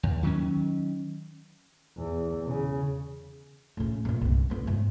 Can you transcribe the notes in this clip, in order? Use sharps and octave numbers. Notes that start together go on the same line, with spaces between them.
D#2
D#3 F#3 C#4
E2
C#3
A2 C#3
A#1 A#2
C2 G2
D3 B3
G#2